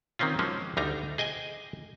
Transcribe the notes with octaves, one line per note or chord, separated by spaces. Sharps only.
D#3 A#3 C4 C#4 F4
F3 F#3 G#3 A#3 C#4
D2 G3 D4 D#4 A#5
G#4 D#5 G5 G#5